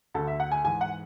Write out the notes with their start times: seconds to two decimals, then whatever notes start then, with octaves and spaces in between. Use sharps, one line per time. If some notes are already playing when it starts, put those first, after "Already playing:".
0.15 D2 D3 A4
0.27 E5
0.40 F#5
0.52 G#5
0.64 G#2 E3 G#5
0.81 F#5